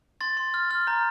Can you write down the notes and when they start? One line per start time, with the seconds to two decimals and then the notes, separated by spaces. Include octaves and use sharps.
0.21 C6 A6
0.37 C6
0.54 F6
0.71 F6
0.87 A#5 G6